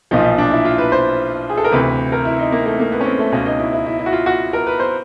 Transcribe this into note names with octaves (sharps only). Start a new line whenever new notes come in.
B1 A#2 F3 D#4
D#4
D4
E4
F4
B4
C5
G#4
A4
A#4
D2 C3 E3 B4
A#4
E4
D#4
A#3
A3
A#3
B3
C#4
C4
A3
C#2 B2 C#4
D#4
E4
E4
E4
E4
F#4
F4
F#4
A#4
B4
C5